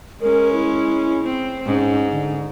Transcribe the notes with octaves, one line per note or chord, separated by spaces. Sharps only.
G#3 C#4 A#4
E4
C4
G#2 C#4
D3